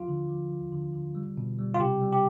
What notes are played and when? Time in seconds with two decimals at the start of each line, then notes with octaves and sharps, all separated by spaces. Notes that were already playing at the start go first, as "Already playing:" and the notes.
Already playing: F3 F4
0.08 D3
0.29 F3
0.51 F3
0.72 D3
0.93 D3
1.15 G3
1.38 B2
1.59 G3
1.75 F4
1.80 C3 G4
2.01 G3
2.12 G4